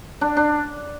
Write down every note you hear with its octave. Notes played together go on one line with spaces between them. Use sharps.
D4
D4